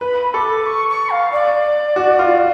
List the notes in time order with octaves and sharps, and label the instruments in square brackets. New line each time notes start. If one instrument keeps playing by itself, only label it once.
[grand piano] B4 [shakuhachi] B5
[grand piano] A4 [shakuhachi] D6
[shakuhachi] C#6
C#6
F5
D5
[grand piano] F#4
F4